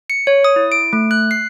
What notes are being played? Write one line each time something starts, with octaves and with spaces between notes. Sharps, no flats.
C#7
C#5
D#6
E4
D7
A3
F#6
C7